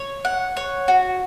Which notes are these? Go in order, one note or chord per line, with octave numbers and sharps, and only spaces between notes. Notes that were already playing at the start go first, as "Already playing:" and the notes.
Already playing: C#5
F#5
C#5
F#4